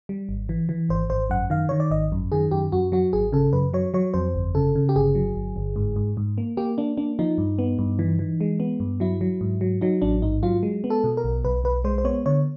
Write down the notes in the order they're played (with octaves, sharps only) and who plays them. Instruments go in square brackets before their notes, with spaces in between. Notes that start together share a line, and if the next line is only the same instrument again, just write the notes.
[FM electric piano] G3
G#1
E3
E3
G#1 C5
G#1 C5
F#2 F#5
D#3 F5
D#3 C#5
D5
G#1 D#5
F#2
D#3 G#4
F#2 G4
F#2 F#4
F#3 F#4
G#1 G#4
C#3 A4
F#2 B4
F#3 C#5
F#3 C#5
F2 C5
G1
C#3 A4
C#3
G4
G1 G#4
F#3
G1
G1
G#2
G#2
G#2
A#3
A#3 G4
A#3 D4
A#3 D4
F3 D#4
G2
B3
G2
E3
E3
G#3
B3
G2
F#3 E4
F#3
G#2
F#3
F#3 D#4
A1 D4
G#2 D#4
F#3 F4
G#3
B3
A4
B2
A#4
B1
B1 B4
B1 B4
G#3 C5
C5
B3 C#5
D3 C#5